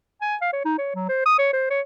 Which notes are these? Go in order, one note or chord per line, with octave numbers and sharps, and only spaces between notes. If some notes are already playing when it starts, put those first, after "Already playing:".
G#5
F5
C#5
D#4
C#5
F#3
C5
D#6
C#5
C5
C#5